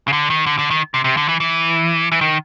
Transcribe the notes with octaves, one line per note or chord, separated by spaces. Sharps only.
C#3
D3
D#3
D3
D3
D#3
C3
C3
D3
E3
E3
E3
D#3